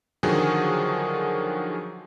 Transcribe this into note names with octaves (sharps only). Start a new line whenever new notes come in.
D3 D#3 F3 F#3 F#4 G#4